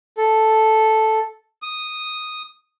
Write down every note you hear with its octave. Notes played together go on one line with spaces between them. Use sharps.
A4
D#6